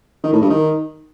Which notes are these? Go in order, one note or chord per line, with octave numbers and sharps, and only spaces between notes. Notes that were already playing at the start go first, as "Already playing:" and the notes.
D#3
A2
G2
D#3